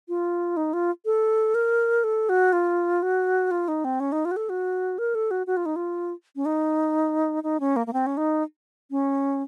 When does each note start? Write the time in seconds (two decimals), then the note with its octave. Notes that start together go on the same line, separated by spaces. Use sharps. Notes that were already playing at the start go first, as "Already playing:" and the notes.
0.08 F4
0.57 D#4
0.73 F4
1.05 A4
1.55 A#4
2.04 A4
2.29 F#4
2.53 F4
3.02 F#4
3.51 F4
3.68 D#4
3.84 C4
4.00 C#4
4.12 D#4
4.25 F4
4.31 F#4
4.36 A4
4.49 F#4
4.98 A#4
5.15 A4
5.31 F#4
5.47 F#4
5.57 F4
5.66 D#4
5.76 F4
6.36 C#4
6.45 D#4
7.43 D#4
7.60 C#4
7.76 A#3
7.87 A#3
7.93 C4
8.06 C#4
8.17 D#4
8.91 C#4